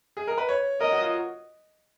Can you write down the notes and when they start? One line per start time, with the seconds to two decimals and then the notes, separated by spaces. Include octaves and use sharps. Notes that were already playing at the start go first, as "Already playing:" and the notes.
0.17 G#4
0.27 A#4
0.38 B4
0.49 C#5
0.80 A#4 D#5
0.92 F#4
1.02 F4